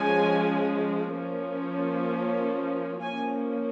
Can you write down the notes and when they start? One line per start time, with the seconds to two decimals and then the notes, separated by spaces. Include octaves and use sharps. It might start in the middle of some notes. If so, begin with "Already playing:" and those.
Already playing: F3 G#3 C#4 G#5
1.13 F3 A#3 C#4
3.02 F3 A#3 C#4 G#5